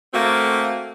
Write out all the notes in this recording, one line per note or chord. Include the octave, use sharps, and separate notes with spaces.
A3 A#3 C4 F#4